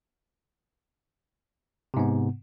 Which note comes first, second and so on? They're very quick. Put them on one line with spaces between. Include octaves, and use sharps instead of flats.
C3 G#2 B3